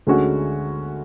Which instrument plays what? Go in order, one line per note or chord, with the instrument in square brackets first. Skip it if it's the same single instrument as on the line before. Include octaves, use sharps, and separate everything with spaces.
[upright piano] D2 D3 G#3 C#4 F#4